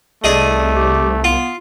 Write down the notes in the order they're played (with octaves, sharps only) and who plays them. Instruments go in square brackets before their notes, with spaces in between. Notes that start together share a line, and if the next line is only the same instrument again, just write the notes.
[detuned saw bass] C2 [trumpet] A3 [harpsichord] D4 G#4 D#5
[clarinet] G4
[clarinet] B3 [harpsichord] F4